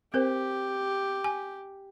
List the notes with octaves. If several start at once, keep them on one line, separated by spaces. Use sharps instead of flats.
C4 G4 A#4 C5
G#5